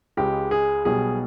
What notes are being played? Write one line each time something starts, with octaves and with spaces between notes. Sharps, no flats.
C#2 C#3 G#3 G4
G#4
B1 B2 G3 G#4